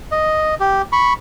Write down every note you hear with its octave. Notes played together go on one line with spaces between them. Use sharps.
D#5
G4
B5 C#6